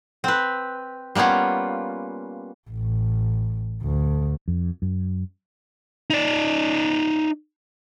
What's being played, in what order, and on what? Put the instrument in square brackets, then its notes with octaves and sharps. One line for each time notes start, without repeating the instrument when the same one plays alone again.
[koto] C4 B4
G3 A#3 B3 C#4 F4
[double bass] A1
D2
[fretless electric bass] F2
F#2
[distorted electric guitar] D#4 D5